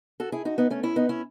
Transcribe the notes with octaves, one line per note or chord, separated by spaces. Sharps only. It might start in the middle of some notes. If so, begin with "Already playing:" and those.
F#4 A4
E4 G#4
D#4 F#4
B3 D#4
A3 C#4
C#4 E4
B3 D#4
C#4 E4